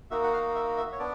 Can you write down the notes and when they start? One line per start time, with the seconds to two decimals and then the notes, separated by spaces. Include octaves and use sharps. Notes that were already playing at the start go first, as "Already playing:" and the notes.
0.11 A#3 D#4 F#4 E5
0.24 F#5
0.33 F5
0.55 E5
0.77 E5
0.92 C#5
0.99 B3 D4 D5